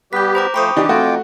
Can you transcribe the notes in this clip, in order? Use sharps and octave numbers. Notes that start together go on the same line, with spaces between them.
G3 B3 G4 B4 G6 B6
C5 A#5 D6
F3 A3 C5 G5 B5 C#6 D#6
E3 D4 D#4 G4
F2 A3 F4 F#4 G5 D6